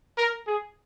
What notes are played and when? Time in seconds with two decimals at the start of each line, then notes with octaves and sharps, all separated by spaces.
0.18 A#4
0.47 G#4